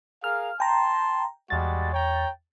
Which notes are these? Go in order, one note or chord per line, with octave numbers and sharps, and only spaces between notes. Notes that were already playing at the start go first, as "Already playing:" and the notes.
G#4 A#4 F5 F6
G5 A5 A#5 C6
E2 G3 G#3 F#4 A6
C#5 G5 A#5